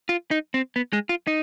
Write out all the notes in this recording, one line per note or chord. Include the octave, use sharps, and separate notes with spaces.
F4
D#4
C4
B3
G#3
F4
D#4